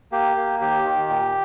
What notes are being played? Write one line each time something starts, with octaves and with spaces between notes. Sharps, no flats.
A#3 G4
A#3
D#2 G4
D#3
A#2